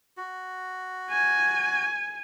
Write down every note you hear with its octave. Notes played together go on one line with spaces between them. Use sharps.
F#4
G#5